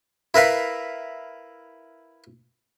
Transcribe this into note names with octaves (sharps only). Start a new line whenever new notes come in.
E4 A#4 B4 F5